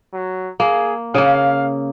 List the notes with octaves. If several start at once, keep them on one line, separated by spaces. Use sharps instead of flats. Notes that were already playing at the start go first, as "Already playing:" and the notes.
F#3
A#3 G#4
C#3 A#3 F5